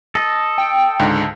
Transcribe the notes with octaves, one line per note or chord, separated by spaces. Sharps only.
A4 D#5
G5
C#2 G#2 D3